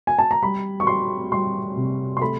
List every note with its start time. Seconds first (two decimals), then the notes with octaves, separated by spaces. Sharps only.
0.07 G#5
0.19 A5
0.31 A#5
0.42 G3 B5
0.80 C#6
0.87 G3 C6
1.32 G3 C6
1.77 C3
2.17 C6
2.21 A3 B5